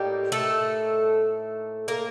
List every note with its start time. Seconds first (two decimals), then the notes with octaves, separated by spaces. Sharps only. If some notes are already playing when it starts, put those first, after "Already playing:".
Already playing: A2 G3 A#3 D#4 G4
0.32 A3 A4
1.88 A#3 A#4